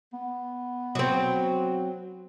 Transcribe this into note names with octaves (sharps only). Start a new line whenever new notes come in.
B3
F#3 C4